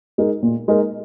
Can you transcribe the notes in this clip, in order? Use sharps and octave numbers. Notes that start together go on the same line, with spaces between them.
G#3 D#4 A#4
A#2
G#3 D#4 A#4